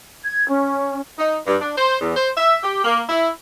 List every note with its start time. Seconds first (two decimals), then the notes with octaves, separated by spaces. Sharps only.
0.23 G#6
0.48 C#4
1.19 D#4
1.46 G2
1.61 D4
1.78 C5
2.01 E2
2.17 C5
2.37 E5
2.63 G4
2.84 A#3
3.09 E4